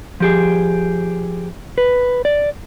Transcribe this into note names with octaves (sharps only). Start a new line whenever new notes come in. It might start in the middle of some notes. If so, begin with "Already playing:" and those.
F3 G4 G#4
B4
D5